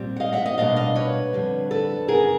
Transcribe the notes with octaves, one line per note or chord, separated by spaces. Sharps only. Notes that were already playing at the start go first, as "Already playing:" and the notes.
Already playing: A#2 G3 C4
F#5
D#5 F5
E5 F#5
D#5 F5
B2 G3 A#3 D4 D#5 F5
D#5 F5
B4 C#5
F2 D3 G3
A4 B4
F#2 C#3 F#3 B3 G#4 A#4